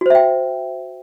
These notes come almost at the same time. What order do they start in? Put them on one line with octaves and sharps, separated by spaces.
F#4 C5 E5 G5